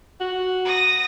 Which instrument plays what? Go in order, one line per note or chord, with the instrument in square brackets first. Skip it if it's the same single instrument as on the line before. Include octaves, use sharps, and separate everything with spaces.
[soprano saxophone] F#4
[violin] D#6 A#6